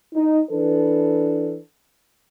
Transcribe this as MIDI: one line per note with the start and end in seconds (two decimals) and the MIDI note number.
0.14 0.40 63
0.50 1.57 52
0.50 1.57 62
0.50 1.57 69
0.50 1.57 71